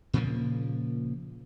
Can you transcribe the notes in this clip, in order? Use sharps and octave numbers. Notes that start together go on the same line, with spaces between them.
A#2 C#3 F3 A#3